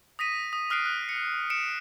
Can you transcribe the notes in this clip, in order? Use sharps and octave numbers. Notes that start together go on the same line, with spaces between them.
D#6 A#6 B6 D#7
D#6
D#6 F6 F#6 C7 D7 D#7
F#6
C#7
C#7 D7 E7